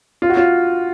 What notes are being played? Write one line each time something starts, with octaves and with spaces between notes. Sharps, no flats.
F4
F#4
F4